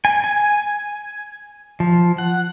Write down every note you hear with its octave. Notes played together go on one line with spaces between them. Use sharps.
G#5
G#5
F3
F#5